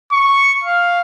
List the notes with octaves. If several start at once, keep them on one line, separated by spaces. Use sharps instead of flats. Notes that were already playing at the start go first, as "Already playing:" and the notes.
C#6
F5